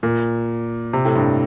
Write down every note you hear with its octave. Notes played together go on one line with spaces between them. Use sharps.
A#2
C3
A2
G2